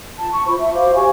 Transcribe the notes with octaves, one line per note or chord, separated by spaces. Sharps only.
F4 A5
C#6
F4 C5 B5 C#6
E5
F#4 C5 F5 D6
G4 C#5 G#5 C#6